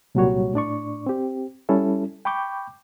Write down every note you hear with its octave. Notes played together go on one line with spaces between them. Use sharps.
C2 A#2 F#3 G3 F#4 C#5
A2 D4 D5 C#6
C4 G4
G3 C#4 E4 A4
G5 B5 C#6 D6 G6